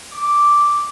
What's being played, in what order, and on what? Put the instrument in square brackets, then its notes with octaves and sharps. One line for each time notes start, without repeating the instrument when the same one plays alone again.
[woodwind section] D6